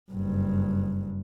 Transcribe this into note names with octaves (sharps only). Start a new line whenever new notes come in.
F#1 G2